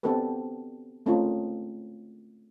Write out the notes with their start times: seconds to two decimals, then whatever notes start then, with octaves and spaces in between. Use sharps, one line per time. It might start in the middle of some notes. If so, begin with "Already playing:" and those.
0.03 B3 C4 D4 G4 A4 B4
1.06 G#3 A3 C4 C#4 D#4 F4